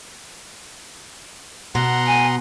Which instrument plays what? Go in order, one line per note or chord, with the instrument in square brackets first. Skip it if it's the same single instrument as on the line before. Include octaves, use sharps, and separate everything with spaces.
[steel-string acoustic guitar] B2 [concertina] F#5 A#5 C6
[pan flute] G#5